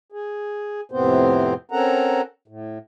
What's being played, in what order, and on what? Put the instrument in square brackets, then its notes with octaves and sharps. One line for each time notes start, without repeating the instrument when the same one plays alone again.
[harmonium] G#4
F2 A2 C3 B3 C4 C5
C4 C#4 A4 A#4 F#5 A#5
A2